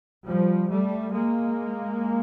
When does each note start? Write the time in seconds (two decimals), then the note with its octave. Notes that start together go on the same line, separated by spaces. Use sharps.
0.25 F3 G3
0.69 G3 A3
1.14 G#3 A#3